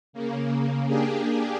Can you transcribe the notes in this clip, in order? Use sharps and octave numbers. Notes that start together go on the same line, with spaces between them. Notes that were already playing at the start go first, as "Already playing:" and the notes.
C#3 A#3
A#3 D4 G4 G#4